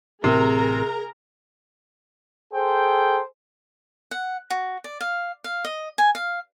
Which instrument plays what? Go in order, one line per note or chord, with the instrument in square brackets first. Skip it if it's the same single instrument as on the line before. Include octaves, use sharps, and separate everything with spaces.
[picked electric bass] A1 A2 C4 [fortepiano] C3 [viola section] G#4 A#4 A#5
[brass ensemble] G#4 A4 C5 G5
[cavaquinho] F#5
F#4
D5
F5
F5
D#5
G#5
F5